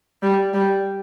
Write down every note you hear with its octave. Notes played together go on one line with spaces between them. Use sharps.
G3
G3